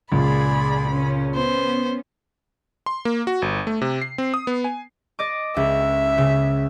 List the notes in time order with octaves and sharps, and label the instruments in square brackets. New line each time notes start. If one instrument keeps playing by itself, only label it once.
[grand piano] C#2 A#2 [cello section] G#4 D5 [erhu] B5
[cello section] C#3 C#4
[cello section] B3 C#4 [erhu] C5
[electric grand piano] C6
A#3
F#4
G1
A3
C3
C7
C4
D#6
B3
G#5
[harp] D5 D#5 D6
[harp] C#2 [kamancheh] E5
[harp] C#3